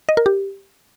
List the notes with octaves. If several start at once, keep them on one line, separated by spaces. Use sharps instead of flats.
D#5
A#4
G4